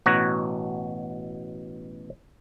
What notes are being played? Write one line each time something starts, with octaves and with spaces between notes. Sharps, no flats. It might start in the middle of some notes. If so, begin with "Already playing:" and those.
A1 B2 F#4 C#5 F#5 A#5